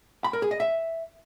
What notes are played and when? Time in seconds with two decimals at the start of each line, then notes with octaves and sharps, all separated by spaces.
0.24 B5
0.33 A#4
0.42 G#4
0.51 D#5
0.60 E5